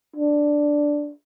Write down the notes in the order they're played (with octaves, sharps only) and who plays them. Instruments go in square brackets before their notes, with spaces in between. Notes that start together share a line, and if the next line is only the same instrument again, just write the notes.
[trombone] D4